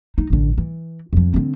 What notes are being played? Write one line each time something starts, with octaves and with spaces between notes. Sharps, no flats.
D#4
A1 D3
E3
F2 F3
D3 C4